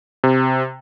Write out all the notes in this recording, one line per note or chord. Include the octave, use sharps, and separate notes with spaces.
C3